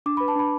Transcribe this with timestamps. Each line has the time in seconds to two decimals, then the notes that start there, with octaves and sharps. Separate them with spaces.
0.06 D4 D6
0.17 B5
0.20 B4
0.28 A5
0.36 D4 B5